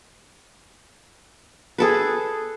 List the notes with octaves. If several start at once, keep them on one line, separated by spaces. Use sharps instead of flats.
G#4 A4 B4